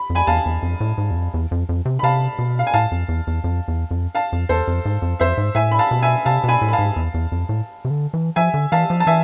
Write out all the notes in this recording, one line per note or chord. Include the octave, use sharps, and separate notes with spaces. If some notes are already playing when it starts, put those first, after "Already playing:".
Already playing: B5
F2
G#5 B5
E2 F5 A5
E2
F2
A2
G#2
E2
F2
E2
F2
F2
C3
B5
C3 F5 A5
B2
F5
G#5
A2 F5 A5
F2
E2
E2
F2
E2
F2
F5 A5
F2
E2 A4 C5
F2
G#2
F2
F2 C5 E5
G#2
A2 E5 G#5
B5
F5 A5
B2
E5 G#5
C3 F5 A5
B2 G#5 B5
A2
B5
F5 A5
G#2
E2
E2
F2
A2
C3
D3
E3
F3 E5 G#5
D3
E3 F5 A5
F3
A5
E3 E5 G#5